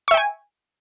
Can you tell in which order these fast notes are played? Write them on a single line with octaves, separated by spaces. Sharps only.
C#6 E5 G5 G#5